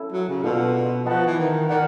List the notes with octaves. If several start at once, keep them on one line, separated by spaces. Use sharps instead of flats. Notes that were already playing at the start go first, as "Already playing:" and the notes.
Already playing: C#4 E4 A4
F#3
C#3
B2 D4 F4 A4
F3 F#4 B4 D#5 F#5 A5
E3
D#3
D#3 A#4 D5 F#5